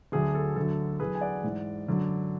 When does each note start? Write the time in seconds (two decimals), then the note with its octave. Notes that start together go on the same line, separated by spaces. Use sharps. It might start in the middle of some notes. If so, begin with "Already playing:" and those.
0.12 D2 D3 F#3 G#4
0.35 A4
0.56 D2 D3 F#3 A4
1.00 E2 D3 F#3 G#4 B4
1.15 G#5
1.21 D5 F#5
1.43 G#2 E3
1.87 F#2 D3 F#3